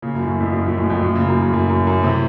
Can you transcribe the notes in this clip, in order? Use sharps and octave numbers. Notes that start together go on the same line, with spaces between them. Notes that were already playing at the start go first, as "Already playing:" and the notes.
A#2 C#3
F#2 A#2
A2
F#2
F2 A2
F#2 A#2
F2 A2
F#2 A#2
F2 A2
F#2 A#2
A#2 C#3
F#2 A#2
A2
F#2 A#2
F#2
F#2
F#2 A#2
A2 C3